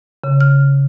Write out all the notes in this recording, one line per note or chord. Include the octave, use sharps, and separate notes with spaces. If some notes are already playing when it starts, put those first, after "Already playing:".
C#3
F6